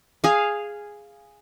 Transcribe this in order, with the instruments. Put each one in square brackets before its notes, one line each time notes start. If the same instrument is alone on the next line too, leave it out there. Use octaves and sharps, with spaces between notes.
[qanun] G#4 F5